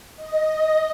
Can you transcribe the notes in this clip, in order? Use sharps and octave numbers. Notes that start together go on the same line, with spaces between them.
D#5